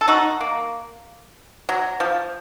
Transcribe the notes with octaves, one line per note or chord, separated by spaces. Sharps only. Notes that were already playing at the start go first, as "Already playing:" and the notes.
A4
D#4 F#4
A#3
F#3
F3